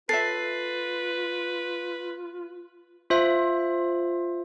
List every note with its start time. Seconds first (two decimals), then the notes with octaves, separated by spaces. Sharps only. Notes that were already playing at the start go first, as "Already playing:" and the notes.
0.09 F4 A4 B4 C#5 E5 A6 C7
3.10 F4 C5 E5